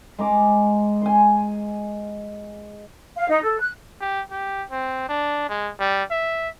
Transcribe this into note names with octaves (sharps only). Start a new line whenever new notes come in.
G#3 A#5 D6
G#5 C6
F5
D#4
A4
F#6
G4
G4
C4
D4
G#3
G3
E5